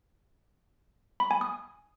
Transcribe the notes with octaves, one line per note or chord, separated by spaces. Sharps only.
B5
G#5
D#6